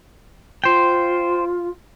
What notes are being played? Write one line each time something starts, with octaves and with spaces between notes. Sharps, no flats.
F4 C5 G5